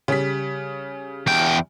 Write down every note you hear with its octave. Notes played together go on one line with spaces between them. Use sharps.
C#3 G3 B6
E2 G5